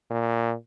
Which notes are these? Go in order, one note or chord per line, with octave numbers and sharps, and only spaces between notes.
A#2